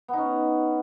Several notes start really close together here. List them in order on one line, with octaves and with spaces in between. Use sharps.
B3 D#4 C#4